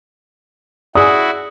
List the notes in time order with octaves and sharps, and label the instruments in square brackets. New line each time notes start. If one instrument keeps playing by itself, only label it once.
[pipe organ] E4 F#4 [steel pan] G#4 D5 [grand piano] D#6